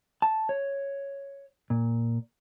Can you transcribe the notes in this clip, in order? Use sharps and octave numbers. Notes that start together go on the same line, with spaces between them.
A5
C#5
A#2